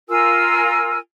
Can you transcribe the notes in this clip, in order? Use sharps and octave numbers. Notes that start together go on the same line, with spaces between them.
F4 A#4 G#5 E6